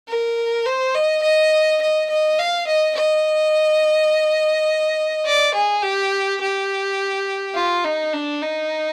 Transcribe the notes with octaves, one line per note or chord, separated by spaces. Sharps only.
A#4
C5
D#5
D#5
D#5
D#5
F5
D#5
D#5
D5
G#4
G4
G4
F4
D#4
D4
D#4